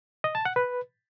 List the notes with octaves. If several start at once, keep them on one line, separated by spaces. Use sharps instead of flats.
D#5
A5
F#5
B4